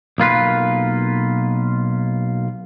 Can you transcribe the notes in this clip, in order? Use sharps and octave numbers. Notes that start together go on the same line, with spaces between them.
B1 A#3 F4 B4